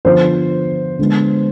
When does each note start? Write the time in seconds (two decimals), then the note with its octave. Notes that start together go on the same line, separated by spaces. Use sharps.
0.05 D3 F3 B3 C5
0.99 D3 G#3 B3